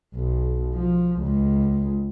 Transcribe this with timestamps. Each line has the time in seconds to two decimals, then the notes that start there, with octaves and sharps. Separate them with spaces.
0.14 B1
0.75 F3
1.20 C#2